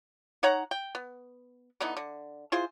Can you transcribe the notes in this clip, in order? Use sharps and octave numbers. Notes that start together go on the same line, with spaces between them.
D#4 C#5 F#5 A#5
G5
B3
D3 E3 B3 D#4
D3
E4 F4 G#4 C5